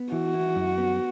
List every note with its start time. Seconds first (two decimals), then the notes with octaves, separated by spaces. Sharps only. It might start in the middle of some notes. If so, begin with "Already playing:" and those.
Already playing: B3
0.12 E3 F#4
0.34 E4
0.56 F#2
0.78 B3